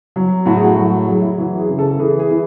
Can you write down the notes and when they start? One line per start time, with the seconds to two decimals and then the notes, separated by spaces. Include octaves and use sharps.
0.16 F#3
0.46 A2 F#4
0.56 G#4
0.65 F#4
0.77 F#3 F#4
0.92 F#4
1.08 F#3 G#4
1.22 E4
1.38 E3 F#4
1.58 G#4
1.69 C#3
1.79 A4
1.99 E3 G#4
2.19 G#4
2.30 E3